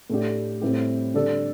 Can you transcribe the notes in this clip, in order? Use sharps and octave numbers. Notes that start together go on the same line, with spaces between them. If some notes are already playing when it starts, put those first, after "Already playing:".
A2 A3 D4 G4
A2 G3 C4 E4 G4
D3 G3 D4 A4